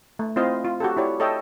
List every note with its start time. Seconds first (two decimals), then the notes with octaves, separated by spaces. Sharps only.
0.19 A3
0.36 C4 E4 F4 C5 D#5 F5
0.65 F4
0.80 F#4 G4 A4
0.97 E4 G4 C#5 D5
1.20 A4 C#5 D#5 E5 G5 A5